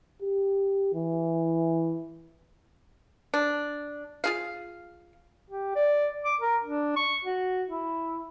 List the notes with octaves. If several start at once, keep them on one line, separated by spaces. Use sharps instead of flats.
G4
E3
D4
F4 G#4 F5
G4
D5
D6
A#4
D4
C#6
F#4
E4